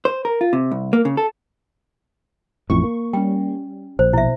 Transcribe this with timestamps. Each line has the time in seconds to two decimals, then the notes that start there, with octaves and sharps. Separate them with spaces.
0.05 C5
0.25 A#4
0.41 F4
0.53 C3
0.71 C2
0.93 A#3
1.05 C#3
1.17 A4
2.70 A1 F2 A2 C#6
2.84 A#3
3.13 G3 C#4 G5
3.99 A#1 C5
4.13 B2 E4 E5